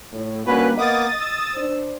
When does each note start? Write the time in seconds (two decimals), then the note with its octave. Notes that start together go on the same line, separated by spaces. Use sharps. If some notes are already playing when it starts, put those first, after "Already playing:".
0.12 A2
0.46 D3 G3 A#3 C#4 F#4 B4
0.78 A#3 B3 D#5 D6 D#6 A6
1.20 E6
1.56 D4 C5